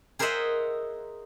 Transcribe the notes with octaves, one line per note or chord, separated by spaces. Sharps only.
G#4 A#4 C5 D#5 E5 F#5